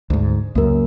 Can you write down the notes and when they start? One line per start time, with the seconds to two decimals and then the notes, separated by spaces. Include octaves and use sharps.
0.10 D2 G#2
0.55 C#2 F#2 A#3 A#4